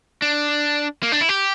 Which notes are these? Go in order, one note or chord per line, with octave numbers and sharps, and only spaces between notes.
D4
A#3
D4
E4
G4